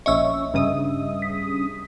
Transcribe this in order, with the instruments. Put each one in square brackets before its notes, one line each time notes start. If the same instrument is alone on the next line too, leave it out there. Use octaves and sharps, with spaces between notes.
[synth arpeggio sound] A#1 C#4 C#6 [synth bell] D#5 E5 E6
[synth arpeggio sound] G2 C#3 D#6
[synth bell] B6